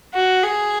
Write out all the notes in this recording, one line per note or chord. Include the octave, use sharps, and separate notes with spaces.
F#4
G#4